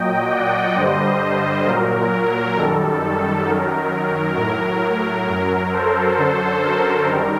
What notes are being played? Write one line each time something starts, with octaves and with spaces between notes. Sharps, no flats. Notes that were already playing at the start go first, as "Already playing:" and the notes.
Already playing: A#2 F#3 D#5 G5
D5 F#5
G2 D3 G3 C5 D#5
A#2 F#3 A#4
F#2 D#3 G3 A4
F#2 D#3 F#3 A#4
A2 F#3 A#4
F#2 F#3
A4 C5
F#2 D3 F#3
A#4
F#2 D#3 G3